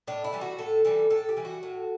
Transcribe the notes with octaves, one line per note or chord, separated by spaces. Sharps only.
A2 D4
E4
E3 G3
F#4
A2 A4
E3 G3 A4
A2 A4
G4
E3 G3
F#4
A2